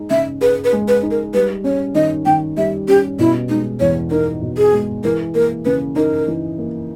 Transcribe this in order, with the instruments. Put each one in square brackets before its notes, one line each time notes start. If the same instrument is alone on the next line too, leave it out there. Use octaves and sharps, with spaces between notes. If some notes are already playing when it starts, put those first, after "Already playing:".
Already playing: [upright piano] G#3 D#4
[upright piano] C#3 [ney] E5
[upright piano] G#4 [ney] B4
[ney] B4
[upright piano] G#3
[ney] B4
[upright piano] D#4
[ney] A#4
[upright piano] G3 [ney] B4
[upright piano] C#4 [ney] C#5
[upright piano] D#3 [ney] D#5
[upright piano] D#3 [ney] G5
[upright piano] G3 [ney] E5
[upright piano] C#4 [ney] G4
[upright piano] B2 [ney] E4
[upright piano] G#3 [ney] D#4
[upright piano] E2 [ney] C#5
[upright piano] D#4 [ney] A#4
[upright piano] B2
[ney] G#4
[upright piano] G#3
[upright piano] E3 [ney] A#4
[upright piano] A#3 [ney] A#4
[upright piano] C#3 [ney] B4
[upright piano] D#4 [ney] A#4
[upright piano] E3
A#3